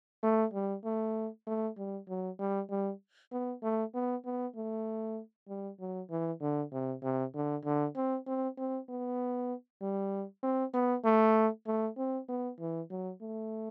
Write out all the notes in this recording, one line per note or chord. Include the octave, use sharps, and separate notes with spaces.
A3
G3
A3
A3
G3
F#3
G3
G3
B3
A3
B3
B3
A3
G3
F#3
E3
D3
C3
C3
D3
D3
C4
C4
C4
B3
G3
C4
B3
A3
A3
C4
B3
E3
F#3
A3